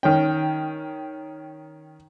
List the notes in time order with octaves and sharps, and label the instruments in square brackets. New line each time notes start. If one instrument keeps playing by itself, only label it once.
[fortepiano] D#3 C#4 G5